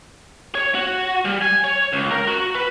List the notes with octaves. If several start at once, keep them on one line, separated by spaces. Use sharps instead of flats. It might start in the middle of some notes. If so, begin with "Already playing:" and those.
C#5
F#4
G3
G#5
C#5
C#2
A#4
F#4
B4